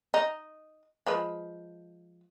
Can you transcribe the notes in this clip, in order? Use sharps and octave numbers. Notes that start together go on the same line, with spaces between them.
D#4
F3 G#3 B4